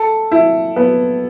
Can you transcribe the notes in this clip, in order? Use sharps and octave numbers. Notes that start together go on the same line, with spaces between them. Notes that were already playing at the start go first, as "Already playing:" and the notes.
Already playing: A4
E4
B3